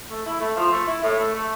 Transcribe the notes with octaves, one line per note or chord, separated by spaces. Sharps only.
A3
E4
A3
F3
A3
E4
A2
A3
A3